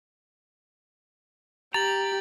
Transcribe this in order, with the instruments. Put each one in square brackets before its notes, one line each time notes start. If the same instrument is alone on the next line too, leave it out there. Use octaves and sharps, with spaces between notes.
[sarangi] G4 [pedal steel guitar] A#5 [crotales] A6 F#7